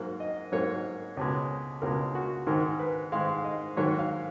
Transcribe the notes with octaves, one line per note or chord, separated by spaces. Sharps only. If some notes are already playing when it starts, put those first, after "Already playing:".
Already playing: G#2 F#3 A#3
D#5
G#2 F#3 A#3 C#5
C#2 B2 G#3
C#2 B2 G#3 A#4
F#4
G#2 D#3 G#3 A#4
B4
G#2 D#3 G#3 F5
D#5
G#2 D#3 F#3 A#3 C#5
F5